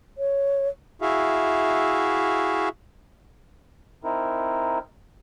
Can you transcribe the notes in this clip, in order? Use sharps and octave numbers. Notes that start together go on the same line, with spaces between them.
C#5
E4 F#4 G#4 E5 F5
C4 D#4 E4 A#4